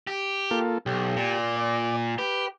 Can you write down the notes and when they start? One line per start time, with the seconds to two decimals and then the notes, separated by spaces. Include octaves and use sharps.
0.07 G4
0.51 A#3 F4 A4
0.86 B1 G4
1.16 A#2
1.56 D5
2.18 G4 B4